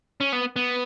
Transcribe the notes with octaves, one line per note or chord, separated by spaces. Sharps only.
C#4
B3
B3